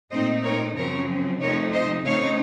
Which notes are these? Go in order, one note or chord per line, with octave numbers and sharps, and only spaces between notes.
A#2 A3 C4 D#4 C5 D#5
A#4 C#5
F#2 C#3 F3 C4 A#4 C#5
F2 C3 F3 A3 D#4 A#4 C#5
C5 D#5
C#3 A3 C4 D#4 C#5 F5